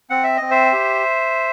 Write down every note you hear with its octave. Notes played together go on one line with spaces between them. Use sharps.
C4 F#5
E5
C4 D#5
C5 E5
G4